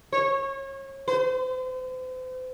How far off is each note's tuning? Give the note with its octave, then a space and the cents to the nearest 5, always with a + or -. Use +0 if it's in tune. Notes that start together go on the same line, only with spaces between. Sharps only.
C#5 -30
C5 -40